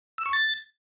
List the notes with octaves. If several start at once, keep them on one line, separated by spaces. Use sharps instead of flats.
E6
C#6
A6